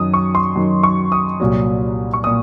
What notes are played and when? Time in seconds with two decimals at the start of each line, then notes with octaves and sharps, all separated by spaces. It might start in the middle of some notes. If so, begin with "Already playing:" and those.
Already playing: F#2 D#3 F#3 D#6
0.14 C#6
0.35 C6
0.56 F#2 D#3 F#3
0.83 C#6
1.12 D#6
1.40 C2 A#2 F#3
2.14 C#6
2.24 A#2 D#6